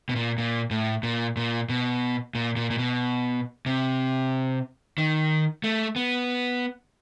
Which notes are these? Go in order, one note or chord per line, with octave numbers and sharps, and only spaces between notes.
B2
A#2
A#2
A2
A#2
A#2
B2
A#2
A#2
A#2
B2
C3
D#3
A3
B3